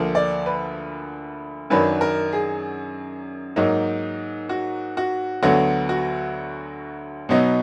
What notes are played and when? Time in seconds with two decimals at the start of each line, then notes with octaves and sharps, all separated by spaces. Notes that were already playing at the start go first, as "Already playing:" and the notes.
Already playing: D2 D3 F3 A#3
0.15 D5
0.46 B4
1.70 F#2 D#3 F#3 D4 B4
2.01 A#4
2.33 G#4
3.56 G#2 F#3 A#3 D#4
4.49 F#4
4.97 F#4
5.42 D2 D3 F#3 B3 F#4
5.89 F#4
7.29 B2 F#3 B3 D#4